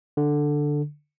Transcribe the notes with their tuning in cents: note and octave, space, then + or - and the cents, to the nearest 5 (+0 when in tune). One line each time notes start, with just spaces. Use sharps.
D3 +5